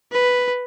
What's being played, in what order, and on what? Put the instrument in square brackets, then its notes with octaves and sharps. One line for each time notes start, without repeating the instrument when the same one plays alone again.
[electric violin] B4